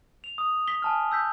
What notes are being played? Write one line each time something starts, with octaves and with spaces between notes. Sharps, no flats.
F7
D#6
B6 G7
G#5 A5 F6
E6 G6 B6